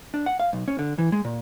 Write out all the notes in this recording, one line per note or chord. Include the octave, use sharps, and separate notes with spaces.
D4
F#5
F5
B1
C#4
D3
E3
G#3
A#2